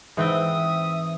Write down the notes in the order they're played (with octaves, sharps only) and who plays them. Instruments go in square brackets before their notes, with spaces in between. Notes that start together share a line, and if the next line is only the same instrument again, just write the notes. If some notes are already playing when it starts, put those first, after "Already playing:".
[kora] G#2 C4 G5 [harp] E3 B4 [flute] E5 [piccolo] D#6